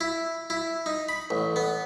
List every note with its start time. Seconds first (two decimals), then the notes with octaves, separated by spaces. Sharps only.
0.01 E4
0.50 E4
0.86 D#4
1.09 B5
1.30 A1
1.56 B3